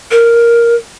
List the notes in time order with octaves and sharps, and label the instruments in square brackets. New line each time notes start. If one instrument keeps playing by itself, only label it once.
[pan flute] A#4